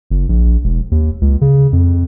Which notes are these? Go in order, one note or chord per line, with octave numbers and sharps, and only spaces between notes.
F#1
A#1
E1
D#2
C#2
C#3
F2